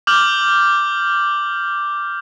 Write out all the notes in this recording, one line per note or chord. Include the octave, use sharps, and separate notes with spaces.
D6 F6 G6 F#7